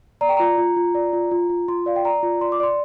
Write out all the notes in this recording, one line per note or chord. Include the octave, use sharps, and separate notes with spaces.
D5 A#5
G5
F4 A#5
F4
F4
D5
F4
F4
F4
F4 C6
D5 F5
G5
D5 A#5
F4
D5 C6
D6
D5 C6